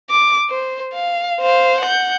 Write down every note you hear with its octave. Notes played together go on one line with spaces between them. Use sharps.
D6
C5
F5
C5 F5
F#5 G6